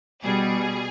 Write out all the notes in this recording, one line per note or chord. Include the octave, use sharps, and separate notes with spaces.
B2 G3 G#4